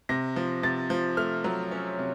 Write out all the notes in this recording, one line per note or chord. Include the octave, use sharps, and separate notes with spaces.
C3 A#6
F3
C3 A6
F3
A3 F6
F#3
C#4
C3